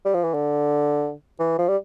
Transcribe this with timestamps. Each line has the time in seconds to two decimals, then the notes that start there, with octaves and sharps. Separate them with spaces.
0.05 G3
0.14 F3
0.24 E3
0.34 D3
1.39 E3
1.58 F3
1.68 G3